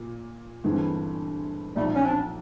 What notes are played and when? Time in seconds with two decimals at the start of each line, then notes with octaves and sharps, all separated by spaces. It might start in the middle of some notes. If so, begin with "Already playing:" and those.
Already playing: A#2
0.64 G1 G2 E3 G#3 C4
1.76 B1 A#2 F3 G3 A3
1.95 C#4
2.04 C4 D4